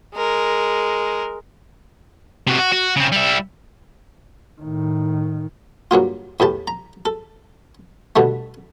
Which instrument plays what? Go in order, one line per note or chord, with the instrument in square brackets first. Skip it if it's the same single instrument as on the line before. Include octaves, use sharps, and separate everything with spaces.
[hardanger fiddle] G#3 A#4
[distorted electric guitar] C3 F#4
F#4
F#4
C#3 C4
G3 E4
[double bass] A2 D#3
[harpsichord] G2 F#3 A#3 F4
E2 A2 G4 A5
A#5
A4
B2 D3 G3 A3